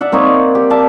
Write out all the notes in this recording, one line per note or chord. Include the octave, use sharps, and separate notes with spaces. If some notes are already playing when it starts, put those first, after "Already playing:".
D5 E5 F#5
A#3 C4 D#4 C#5
D5
G4
D5 E5 F5 A5